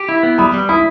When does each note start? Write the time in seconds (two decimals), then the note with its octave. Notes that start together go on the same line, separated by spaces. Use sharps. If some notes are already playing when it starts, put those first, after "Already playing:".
Already playing: G4
0.09 E4
0.23 B3
0.38 G3 B5 D#6
0.54 G3
0.69 E4 B5 D#6